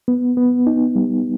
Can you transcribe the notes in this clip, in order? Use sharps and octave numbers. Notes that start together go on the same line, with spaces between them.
B3
B3
D#4
G3